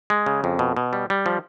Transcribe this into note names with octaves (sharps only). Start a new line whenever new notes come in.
G#3
C#3
F2
B2
B2
G3
G3
F3